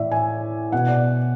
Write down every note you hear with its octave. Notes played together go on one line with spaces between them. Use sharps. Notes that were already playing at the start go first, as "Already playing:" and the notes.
Already playing: A2 E3 D5 E5
G#5
B2 F#5
D5